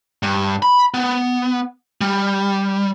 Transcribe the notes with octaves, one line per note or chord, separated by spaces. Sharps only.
G2
B5
B3
G3